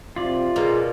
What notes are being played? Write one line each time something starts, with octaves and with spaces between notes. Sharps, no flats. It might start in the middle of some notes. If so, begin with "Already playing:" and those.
C3 F4 D5
B2 A#3 G#4